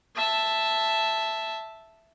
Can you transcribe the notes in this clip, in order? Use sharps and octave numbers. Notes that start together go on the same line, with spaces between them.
E5 A5